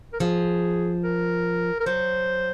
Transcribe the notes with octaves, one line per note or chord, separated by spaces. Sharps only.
A#4
F3 G#4
A#4
A#4
F#3 C5